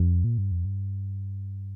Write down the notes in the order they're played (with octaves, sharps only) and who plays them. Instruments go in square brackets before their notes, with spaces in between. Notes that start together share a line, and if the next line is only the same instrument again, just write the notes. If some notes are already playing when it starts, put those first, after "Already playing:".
Already playing: [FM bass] F2
A#2
G2
F2
G2